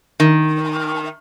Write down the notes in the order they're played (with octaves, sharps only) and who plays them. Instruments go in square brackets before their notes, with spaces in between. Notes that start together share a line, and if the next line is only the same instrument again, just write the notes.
[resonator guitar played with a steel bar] D#3